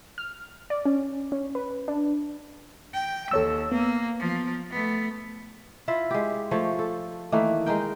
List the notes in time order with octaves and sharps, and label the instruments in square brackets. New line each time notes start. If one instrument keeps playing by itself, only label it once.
[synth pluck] F6
D5
C#4
C#4
B4
D4
[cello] G5
[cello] D#2 [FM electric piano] A4 C#5 E6
[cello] A#3 [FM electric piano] B3
[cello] F3
A3 B3
[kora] E4 F4 E5
G#3 G4
F3 A3 C#5
A4
D#3 E3 A3 A#3
G#3 D#4 A#4 G5